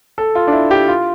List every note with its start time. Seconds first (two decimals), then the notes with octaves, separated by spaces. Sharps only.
0.18 A4
0.35 F4
0.47 D4
0.52 E4
0.71 G4
0.88 F4